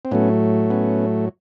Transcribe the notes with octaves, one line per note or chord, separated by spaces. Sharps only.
C4
A2 F#3 A3 B3 C#4
B3 C#4